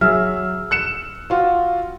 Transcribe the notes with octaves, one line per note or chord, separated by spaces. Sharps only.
F#3 G#4 E5 E6 F6
F#6 C#7 E7
F4 F#4